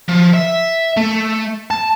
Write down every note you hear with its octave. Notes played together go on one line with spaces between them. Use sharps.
F3
E5
A3
A5